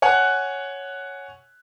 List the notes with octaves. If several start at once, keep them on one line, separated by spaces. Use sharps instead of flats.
C#5 F#5 G#5 F#6